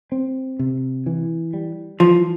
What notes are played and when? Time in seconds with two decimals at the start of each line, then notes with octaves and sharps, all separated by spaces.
0.12 C4
0.59 C3
1.06 E3
1.54 G3
2.00 E3 F3